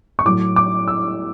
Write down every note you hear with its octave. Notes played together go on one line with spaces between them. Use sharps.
C#6
A2 F#3 D6
D6
E6